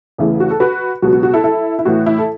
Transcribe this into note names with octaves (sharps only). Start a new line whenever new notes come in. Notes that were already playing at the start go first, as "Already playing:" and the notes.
E2 C#3 E3 A3
F#4
A4
F#4 B4
C#2 B2 F#3 F#4
F#4
F#4
E4 A4
E4 A4
E4
A2 E3 A3 F#4
E4
A4